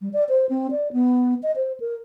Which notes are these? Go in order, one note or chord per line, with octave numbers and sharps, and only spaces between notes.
G3
D5
C5
C4
D5
B3
D#5
C5
A#4